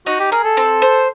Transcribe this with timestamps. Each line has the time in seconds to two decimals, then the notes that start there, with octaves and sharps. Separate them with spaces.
0.06 D#4 F#4
0.20 G4
0.32 G#4 A#4
0.44 A4
0.57 C4
0.82 C5